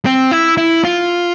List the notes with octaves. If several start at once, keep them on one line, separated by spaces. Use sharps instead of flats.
C4
E4
E4
F4